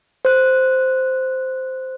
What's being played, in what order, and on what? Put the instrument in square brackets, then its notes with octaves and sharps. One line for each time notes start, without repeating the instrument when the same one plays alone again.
[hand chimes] C5 F#6